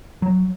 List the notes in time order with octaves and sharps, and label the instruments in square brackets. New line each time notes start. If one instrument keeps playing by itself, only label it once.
[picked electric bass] F#3